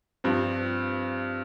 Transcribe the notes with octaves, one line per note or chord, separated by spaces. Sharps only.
G2 F3 C4